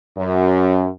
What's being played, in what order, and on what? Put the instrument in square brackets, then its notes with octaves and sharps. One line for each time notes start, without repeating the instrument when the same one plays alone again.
[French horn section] F#2